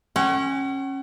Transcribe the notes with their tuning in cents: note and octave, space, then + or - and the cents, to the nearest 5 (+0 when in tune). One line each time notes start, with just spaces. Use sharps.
C#4 -20 F#5 +40